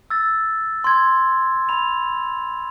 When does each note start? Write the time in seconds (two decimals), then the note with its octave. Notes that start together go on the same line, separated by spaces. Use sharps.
0.10 E6 A6
0.84 C6 G#6
1.69 B5 F7